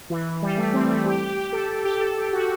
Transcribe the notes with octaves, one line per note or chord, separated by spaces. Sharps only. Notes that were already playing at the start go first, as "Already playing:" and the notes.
E3
G3
A3
C4
A3
G4
G4
G4
A4
G4
G4
A4
G4
F#4